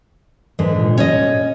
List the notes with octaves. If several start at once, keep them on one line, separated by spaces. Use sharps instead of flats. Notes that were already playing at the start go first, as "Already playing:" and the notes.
G#2 D3 E3
A#2
C#4 C#5 D#5